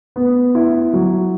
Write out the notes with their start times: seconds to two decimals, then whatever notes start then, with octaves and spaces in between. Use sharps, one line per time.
0.16 B3
0.55 E4
0.93 F#3